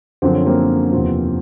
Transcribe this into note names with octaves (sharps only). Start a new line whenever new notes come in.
F#2 D3 F3 C4
C#4
A#3 C4
E2 C3 F3